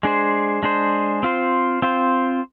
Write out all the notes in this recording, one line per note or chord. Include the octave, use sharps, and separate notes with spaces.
G#3 D4 G#4 C5
G#3 D4 G#4 C5
C4 F4 C5
C4 F4 C5